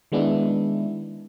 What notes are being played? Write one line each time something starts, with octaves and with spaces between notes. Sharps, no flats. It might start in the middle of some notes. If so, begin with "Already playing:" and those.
D#3 G#3 B3 D4 E4